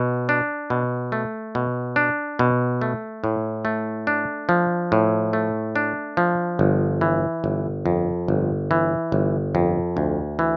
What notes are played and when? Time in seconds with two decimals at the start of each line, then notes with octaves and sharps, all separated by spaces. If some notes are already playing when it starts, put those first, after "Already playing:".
Already playing: B2
0.29 D4
0.70 B2
1.12 A3
1.55 B2
1.96 D4
2.39 B2
2.81 A3
3.24 A2
3.65 A3
4.07 D4
4.49 F3
4.92 A2
5.33 A3
5.76 D4
6.17 F3
6.59 G1
7.01 E3
7.44 G1
7.86 F2
8.28 G1
8.71 E3
9.12 G1
9.55 F2
9.97 D2
10.39 E3